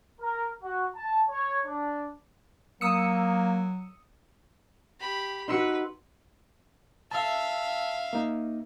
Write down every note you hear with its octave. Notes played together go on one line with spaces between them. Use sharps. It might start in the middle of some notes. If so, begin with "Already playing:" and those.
A#4
F#4
A5
C#5
D4
F#3 A#3 D#6 E6 C#7
G4 B5
D#4 F#4 B4 C6 E6 C#7
E5 F5 A5 E6
A#3 D#4